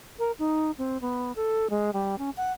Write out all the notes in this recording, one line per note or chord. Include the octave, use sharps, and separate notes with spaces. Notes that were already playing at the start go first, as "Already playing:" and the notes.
A#4
D#4
C4
B3
A4
G#3
G3
C#4
F#5